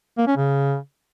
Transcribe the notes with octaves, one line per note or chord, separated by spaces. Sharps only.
A#3
C#4
C#3